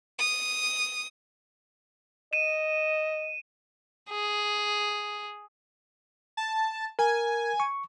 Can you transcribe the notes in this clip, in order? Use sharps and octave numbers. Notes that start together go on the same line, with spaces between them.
D#6
D#5 D#7 E7
G#4
A5
A#4 G#5
C#6